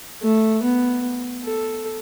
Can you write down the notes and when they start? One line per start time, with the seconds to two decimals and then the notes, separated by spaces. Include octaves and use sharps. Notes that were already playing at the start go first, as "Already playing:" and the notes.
0.22 A3
0.62 B3
1.44 A4